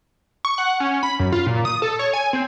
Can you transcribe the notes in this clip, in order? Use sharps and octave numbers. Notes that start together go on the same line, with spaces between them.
C#6
F#5
C#4
B5
F#2
F4
A#2
D#6
A4
C#5
G#5
C4